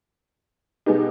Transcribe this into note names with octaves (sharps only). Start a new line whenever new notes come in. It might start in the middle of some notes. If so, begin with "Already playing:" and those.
B2 G#3 B3 D#4 G4